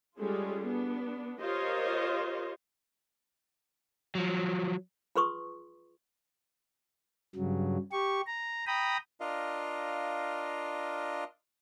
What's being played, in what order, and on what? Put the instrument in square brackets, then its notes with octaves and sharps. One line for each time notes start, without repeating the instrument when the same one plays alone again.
[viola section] G3 G#3 C#4 F4 G#4 A4
B3 D4
F4 G4 A#4 C5 C#5 D#5
[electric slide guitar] F3 F#3
[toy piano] F4 G#4 B4 C6 C#6 D#6
[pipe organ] G2 C#3 F#3
G4 C#6
A#5
G5 A#5 B5 D#6
[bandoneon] D4 F4 A#4 D#5 F5